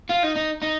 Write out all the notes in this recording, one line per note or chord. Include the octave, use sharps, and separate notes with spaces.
F4
D#4
D#4
D#4